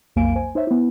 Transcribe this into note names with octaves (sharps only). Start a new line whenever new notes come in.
B1 F2 A#3 F5 G#5 D7
C5 G#5
D#4 C5 C#5 E5
B3 E4